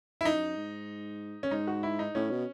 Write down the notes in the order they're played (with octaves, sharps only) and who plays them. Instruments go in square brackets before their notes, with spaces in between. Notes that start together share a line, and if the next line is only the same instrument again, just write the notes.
[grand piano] E4
[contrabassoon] F#2 [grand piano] D#4
[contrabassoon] G#2
[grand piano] C#4
[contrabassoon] G#2 [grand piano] D#4
[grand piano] F#4
E4
D#4
[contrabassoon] A2 [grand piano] C#4
[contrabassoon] B2